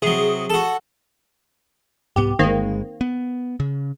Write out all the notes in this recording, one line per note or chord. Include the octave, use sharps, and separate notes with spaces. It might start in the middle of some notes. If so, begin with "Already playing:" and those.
C3 F#3 G#4
F#4 A4
C2 G#2 B3 G4
G1 D#3 G#3 A#3 C4
B3
C#3